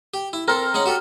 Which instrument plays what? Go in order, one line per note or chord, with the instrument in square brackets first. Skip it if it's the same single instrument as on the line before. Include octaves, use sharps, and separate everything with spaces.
[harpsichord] G4
E4
[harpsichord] C4 A4 [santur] A#4
[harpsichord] G#3 C#4 F#5
F#4 G4 A4